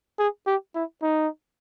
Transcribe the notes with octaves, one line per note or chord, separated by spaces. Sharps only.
G#4
G4
E4
D#4